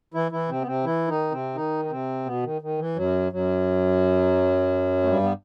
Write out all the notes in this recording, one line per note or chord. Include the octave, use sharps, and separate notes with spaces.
E3 E4
E3 E4
C3 C4
B3
C3 C4
E3 E4
D#3 D#4
C3 C4
D#3 D#4
D#4
C3 C4
B2 B3
D#3
D#3
E3
F#2 F#3
F#2 F#3
A3
G2 G3
B3